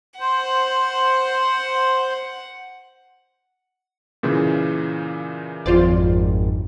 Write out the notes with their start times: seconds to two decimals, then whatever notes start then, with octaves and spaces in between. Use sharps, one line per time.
0.20 C5 F#5
4.23 A#2 C#3 E3
5.66 G#1 F2 F3 F4 C5 D5